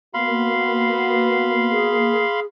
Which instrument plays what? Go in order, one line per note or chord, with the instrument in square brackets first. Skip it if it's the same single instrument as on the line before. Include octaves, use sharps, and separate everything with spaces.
[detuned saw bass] A#3 [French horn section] B3 F#4 [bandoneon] F5 B5 C6
[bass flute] G#4